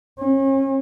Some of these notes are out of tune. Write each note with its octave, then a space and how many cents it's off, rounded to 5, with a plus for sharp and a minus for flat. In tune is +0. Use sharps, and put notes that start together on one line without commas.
C#4 -40